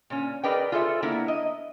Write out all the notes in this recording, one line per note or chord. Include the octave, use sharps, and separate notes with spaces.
A#2 C#4
G#4 A#4 B4 D5 D#5 G5
F4 G#4 A4 C5 E5
A#3 B3 D4 E4
D#5